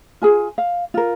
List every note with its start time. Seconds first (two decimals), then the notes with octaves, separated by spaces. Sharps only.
0.22 F4 G#4 G#5
0.58 F5
0.94 F4 A#4